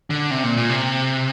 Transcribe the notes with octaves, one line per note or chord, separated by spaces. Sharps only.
D3
C3
A#2
A#2
C3